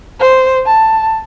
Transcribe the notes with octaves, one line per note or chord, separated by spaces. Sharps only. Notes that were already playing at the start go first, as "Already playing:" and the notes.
C5
A5